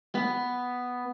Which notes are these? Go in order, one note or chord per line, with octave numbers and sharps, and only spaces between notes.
B3